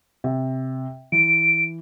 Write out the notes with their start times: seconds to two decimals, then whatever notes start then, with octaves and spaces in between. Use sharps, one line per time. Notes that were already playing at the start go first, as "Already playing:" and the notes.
0.24 C3
1.12 E3 D7